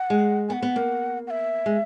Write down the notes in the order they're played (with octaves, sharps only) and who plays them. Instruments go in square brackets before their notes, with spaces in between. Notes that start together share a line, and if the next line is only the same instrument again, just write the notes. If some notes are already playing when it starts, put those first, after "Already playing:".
Already playing: [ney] F#5
[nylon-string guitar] G#3
[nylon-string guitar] B3 [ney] F#5 G#5
[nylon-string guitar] B3
A#3
[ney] F#5
E5
[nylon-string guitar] G#3